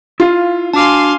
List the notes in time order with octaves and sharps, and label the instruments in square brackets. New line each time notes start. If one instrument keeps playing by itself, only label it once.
[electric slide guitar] E4 F5 [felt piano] F4
[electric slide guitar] D4 F#4 [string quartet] F5 G#5 C6 [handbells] A5 D6